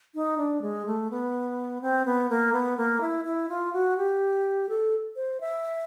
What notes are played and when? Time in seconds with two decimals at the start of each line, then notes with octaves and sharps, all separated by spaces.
0.15 D#4
0.38 D4
0.62 G#3
0.86 A3
1.10 B3
1.82 C4
2.06 B3
2.30 A#3
2.53 B3
2.77 A#3
3.01 E4
3.25 E4
3.49 F4
3.73 F#4
3.97 G4
4.69 A4
5.16 C5
5.41 E5